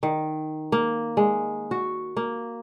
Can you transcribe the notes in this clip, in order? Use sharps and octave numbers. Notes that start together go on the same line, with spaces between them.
D#3
A#3
G#3
F#4
A#3